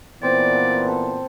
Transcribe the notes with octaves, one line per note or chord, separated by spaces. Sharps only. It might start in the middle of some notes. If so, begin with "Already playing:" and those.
A#2 E3 B3 C4 D5
A4